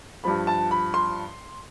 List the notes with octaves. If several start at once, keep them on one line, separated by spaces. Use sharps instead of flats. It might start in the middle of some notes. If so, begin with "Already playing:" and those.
G2 F3 B5
A5
B5
C6